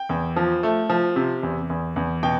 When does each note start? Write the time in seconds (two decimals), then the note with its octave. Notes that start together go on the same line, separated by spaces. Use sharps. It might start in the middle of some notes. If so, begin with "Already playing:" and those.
Already playing: G5
0.09 E2
0.36 F3
0.63 A3
0.90 F3
1.16 C3
1.43 E2
1.70 E2
1.96 E2
2.23 B2 G5